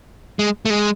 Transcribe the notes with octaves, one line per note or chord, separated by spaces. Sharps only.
G#3
A3
G#3